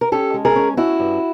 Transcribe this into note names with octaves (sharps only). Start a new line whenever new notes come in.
A#4
C#4 G4 A4
G#3
G#4 A#4
C#4
C#4 E4 F#4
G2